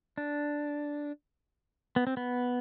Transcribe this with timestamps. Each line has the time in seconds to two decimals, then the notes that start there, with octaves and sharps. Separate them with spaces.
0.17 D4
1.96 B3
2.07 C4
2.17 B3